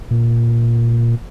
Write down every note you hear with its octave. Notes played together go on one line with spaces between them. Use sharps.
A#2